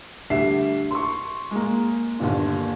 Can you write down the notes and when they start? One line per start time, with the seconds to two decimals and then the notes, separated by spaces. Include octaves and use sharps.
0.30 D2 G3 D4 E5 C7
0.91 C6 C#6
1.51 G#3 A#3
2.20 G1 D#2 A#2